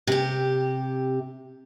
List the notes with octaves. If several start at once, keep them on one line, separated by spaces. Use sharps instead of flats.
C3 G4